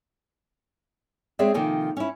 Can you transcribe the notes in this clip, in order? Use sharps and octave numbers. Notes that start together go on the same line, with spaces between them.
G#3 C4 G#4 C#5 D5 E5
C3 D#3 F3 A#3 A4 G#5
C#4 E4